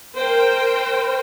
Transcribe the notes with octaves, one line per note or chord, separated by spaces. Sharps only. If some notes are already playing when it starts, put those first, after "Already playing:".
A#4 C5 G5